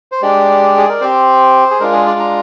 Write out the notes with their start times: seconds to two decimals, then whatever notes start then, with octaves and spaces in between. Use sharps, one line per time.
0.12 C5
0.22 G#3 D4 G4 D5
0.77 G#4
0.89 A#4
1.01 C4 G4 C5
1.71 G#4
1.80 G#3 D4 F4 A#4
1.92 G#4
2.06 D5
2.20 A#5